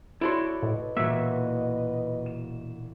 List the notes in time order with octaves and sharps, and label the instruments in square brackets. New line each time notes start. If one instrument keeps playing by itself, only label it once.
[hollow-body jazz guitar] E4 F#4 C6 [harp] A4 C#5 D5
[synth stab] A2 [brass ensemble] B4 D#5
[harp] E1 A#2 F#4 [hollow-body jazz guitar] A#3 [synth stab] E5
[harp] E7